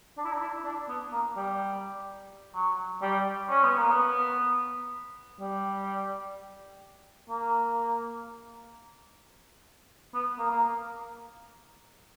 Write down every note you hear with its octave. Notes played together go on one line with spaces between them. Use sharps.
D4
E4
D4
E4
D4
B3
A#3
G3
F#3
G3
C#4
B3
A#3
B3
G3
A#3
B3
A#3
A#3